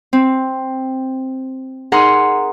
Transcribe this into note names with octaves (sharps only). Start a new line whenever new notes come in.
C4
D#4 G#4 A#4 F#5 A#5 C6